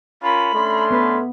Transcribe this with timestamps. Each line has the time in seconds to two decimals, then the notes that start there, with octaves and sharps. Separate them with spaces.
0.23 C#4 F4 A#4 B5
0.54 A3 C#4 D4 C6
0.91 B3 B4